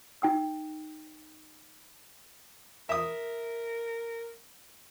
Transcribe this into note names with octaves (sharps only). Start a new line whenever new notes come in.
D#4 G5 E6
A#4 E5 D#6